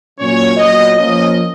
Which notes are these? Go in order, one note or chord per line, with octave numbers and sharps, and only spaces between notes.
A#2 F#3 C#4 C#5
A#2 F#3 B3 D#5
F3 A#3 C#4 D#5